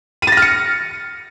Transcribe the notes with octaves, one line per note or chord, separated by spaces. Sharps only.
F6 A6 A#6 C#7 D#7